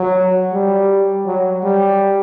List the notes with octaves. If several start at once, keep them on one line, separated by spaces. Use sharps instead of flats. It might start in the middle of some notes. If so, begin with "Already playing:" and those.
Already playing: F#3
G3
F#3
G3